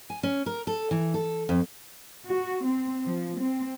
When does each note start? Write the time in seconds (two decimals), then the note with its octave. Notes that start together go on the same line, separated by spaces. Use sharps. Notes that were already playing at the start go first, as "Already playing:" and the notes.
0.10 G#5
0.23 C#4
0.46 A#4
0.67 A4
0.91 E3
1.14 A4
1.49 F2
2.26 F#4
2.65 C4
3.06 F3
3.38 C4